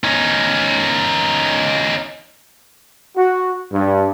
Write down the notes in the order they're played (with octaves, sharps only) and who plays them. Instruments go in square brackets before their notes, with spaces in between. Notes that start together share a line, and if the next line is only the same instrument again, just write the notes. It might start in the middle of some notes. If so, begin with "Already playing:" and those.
[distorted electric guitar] C#4 D#4
[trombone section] F#4
G2